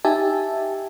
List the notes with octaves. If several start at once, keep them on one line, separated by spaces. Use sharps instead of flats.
D#4 G4 E5 G#5 A5